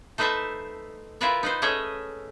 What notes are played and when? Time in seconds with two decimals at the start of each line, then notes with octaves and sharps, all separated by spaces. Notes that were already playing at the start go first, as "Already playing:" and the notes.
0.18 A3 D#4 B4 C5 E5 A5
1.21 E4 F4 A#4 B4 D5 E5
1.43 D#4 B4 C5
1.62 A3 C#4 G#4 C#5 D#5 E5